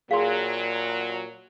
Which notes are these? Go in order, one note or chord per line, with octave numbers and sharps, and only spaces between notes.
A#2 F#3 G#4 F5 C6